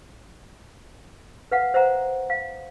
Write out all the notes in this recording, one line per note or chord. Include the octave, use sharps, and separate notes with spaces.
B4 F5 F#5
C5 E5 F#5 A#5
F5